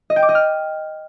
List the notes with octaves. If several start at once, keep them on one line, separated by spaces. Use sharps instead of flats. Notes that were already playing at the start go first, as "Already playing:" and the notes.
D#5
G5
D6
D#5
F6